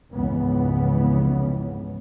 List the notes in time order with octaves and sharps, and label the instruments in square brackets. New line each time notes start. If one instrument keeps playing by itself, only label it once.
[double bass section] F1 C#2 G#2 C#3 E3 B3